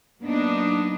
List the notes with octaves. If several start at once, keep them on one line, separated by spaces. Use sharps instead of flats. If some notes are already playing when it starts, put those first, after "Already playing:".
F#3 A#3 B3 D4 D#4